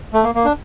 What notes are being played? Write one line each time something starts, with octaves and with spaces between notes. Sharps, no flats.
A3
A#3
A#3
D4